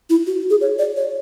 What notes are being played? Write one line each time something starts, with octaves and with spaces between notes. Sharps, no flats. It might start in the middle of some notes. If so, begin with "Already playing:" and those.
E4
F#4
G#4
C#5
D5
C#5